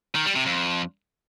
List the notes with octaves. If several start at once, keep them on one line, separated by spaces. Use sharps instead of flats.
D#3
G3
C3
F2